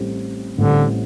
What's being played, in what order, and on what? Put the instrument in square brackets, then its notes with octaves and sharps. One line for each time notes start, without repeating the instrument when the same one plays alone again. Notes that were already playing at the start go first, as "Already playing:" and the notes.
Already playing: [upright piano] A1 A2 G3 C4
[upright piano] A1 A2 G3 C4 [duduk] D3